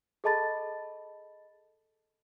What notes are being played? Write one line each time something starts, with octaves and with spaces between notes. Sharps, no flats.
G#4 A4 D#5 A5 B5 A6